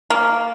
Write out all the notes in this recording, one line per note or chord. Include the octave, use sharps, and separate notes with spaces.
A#3